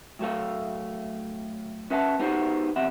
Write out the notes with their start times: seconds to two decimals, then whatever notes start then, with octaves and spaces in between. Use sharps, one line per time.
0.19 A2 F#3 A3 F5
1.91 C#4 B4 E5 F#5 G#5 A5
2.19 B3 D#4 F#4 G4 C5
2.76 E2 C3 E5 F#5 B5